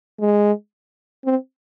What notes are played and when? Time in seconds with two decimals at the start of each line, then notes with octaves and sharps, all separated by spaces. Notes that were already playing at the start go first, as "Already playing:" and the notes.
0.20 G#3
1.25 C4